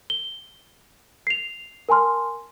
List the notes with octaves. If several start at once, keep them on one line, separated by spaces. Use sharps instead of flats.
G7
C7 F7
A#4 G#5 A5 C6 F6